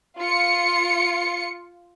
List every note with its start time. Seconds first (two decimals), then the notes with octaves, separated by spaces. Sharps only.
0.19 F4 C#7